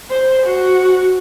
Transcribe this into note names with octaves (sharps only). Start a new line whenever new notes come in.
C5
F#4